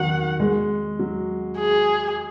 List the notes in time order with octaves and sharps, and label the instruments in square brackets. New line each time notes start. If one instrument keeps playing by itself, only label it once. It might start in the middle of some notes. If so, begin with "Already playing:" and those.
Already playing: [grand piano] D#3 F#3 [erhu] F#5
[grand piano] G#3
F#3
[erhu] G#4